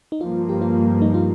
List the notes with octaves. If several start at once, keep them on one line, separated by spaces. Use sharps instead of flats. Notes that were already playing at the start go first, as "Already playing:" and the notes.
D#4
G2 F3 A#3 F4
G4
F4
D#4
F4